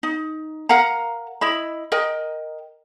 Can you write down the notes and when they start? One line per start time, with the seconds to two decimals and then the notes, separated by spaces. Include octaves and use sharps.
0.03 D#4
0.69 A#4 F5 F#5 A#5
1.41 E4 D#5 B5
1.92 A#4 D#5 G5